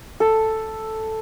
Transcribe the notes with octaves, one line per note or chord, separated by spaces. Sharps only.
A4